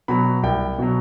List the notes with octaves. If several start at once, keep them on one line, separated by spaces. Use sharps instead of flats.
B2 F#3 B5
C2 G5
B2 F#3